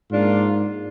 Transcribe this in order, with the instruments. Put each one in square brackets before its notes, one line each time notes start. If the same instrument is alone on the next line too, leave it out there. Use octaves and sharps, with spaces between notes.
[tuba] G#2 [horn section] A#3 D4 F4